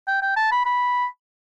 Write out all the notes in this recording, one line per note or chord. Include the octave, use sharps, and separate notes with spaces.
G5
G5
A5
B5
B5